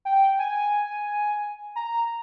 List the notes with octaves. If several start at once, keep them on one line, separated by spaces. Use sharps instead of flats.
G5
G#5
A#5